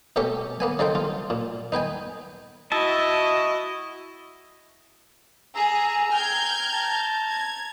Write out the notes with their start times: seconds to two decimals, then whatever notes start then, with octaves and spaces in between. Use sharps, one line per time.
0.16 B2 A3 C#4 G4 E5
0.60 A#3 B3 G#5
0.79 C#3 D#4 A4 C5 G5
0.95 F4
1.30 A#2
1.72 D#4 B4 G5 G#5
2.72 E4 F#4 D#5 E5 A5
5.55 G#4 A#5 E6
6.12 G5 A#5 F6 G6 G#6
6.72 A5 A#5
7.29 G#6